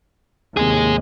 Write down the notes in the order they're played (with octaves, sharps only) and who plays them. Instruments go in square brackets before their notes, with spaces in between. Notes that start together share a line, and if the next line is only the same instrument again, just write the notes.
[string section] D#2 A2 C3 [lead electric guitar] G#3 G#4